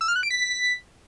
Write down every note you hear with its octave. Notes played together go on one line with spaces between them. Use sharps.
E6
F6
F#6
D7
B6